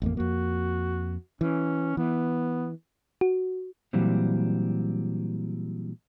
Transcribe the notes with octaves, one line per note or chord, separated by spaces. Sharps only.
A1 F2 A#3
F2 A#3 F#4
E3 C#4
E3 B3
F#4
A#2 E3 F#3 G3 C4